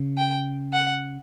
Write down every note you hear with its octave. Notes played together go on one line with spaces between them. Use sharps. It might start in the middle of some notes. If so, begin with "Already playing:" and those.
Already playing: C#3
G5
F#5